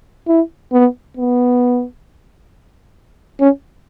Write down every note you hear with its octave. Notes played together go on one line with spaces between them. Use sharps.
E4
B3
B3
C#4